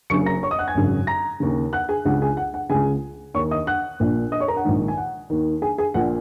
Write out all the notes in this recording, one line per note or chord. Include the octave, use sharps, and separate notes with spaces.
F#1 F#2 C#3 C#6 C#7
A#5 A#6
C#5 C#6
D#5 D#6
F#5 F#6
G#5 G#6
G#1 F#2 C#3
A#5 A#6
D#2 C#3
F#5 F#6
G#4 G#5
C#2 C#3 F#5
G#4 G#5
F#5
F#5
C#2 C#3 G#4 G#5
D#2 D#3 C#5 C#6
D#5 D#6
F#5 F#6
A#1 A#2
D#5 D#6
C#5 C#6
A#4 A#5
F#5
A#1 G#2 D#3
G#5
F#5
D#2 D#3
G#4 G#5
G#4 G#5
A#1 A#2 F#5